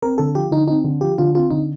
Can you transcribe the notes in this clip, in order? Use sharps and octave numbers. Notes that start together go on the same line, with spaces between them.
C4 A#4
D3 A4
F3 G4
D3 D#4
C4 D#4
D3
F3 G4
D3 F4
C4 F4
D3 D#4